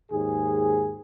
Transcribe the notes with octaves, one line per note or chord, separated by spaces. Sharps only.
D#2 G#2 G#4